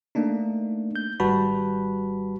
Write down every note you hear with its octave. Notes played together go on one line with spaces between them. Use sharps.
A3 A#3 D4 D#4
G6
G#1 G3 F#4 B4 A5 B5